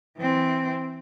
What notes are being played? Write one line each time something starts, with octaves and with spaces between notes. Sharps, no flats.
E3 C4